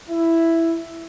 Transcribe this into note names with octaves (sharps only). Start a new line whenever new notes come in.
E4